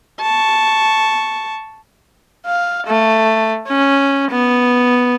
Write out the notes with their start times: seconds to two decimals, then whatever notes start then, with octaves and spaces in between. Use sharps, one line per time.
0.21 A5 C#6
2.46 F5
2.87 A3
3.68 C#4
4.31 B3